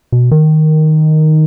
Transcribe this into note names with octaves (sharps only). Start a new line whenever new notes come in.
B2
D#3